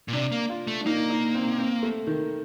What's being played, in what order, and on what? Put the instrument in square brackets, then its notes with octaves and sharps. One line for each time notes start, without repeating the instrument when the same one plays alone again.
[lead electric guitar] A#2
[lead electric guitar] C3 [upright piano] D4
[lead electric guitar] A#3
[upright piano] F4
[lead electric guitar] A3
[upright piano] D4
[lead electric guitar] A#3 [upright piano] D#4
[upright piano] D#4
C4
C4
A3
D#3